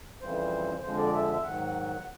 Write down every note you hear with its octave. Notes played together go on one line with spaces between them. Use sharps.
F2 C#3 E3 G3 C5
F2 D3 F3 G#3 C5
D5
E5
E5
G#2 D#3 F#3 F#5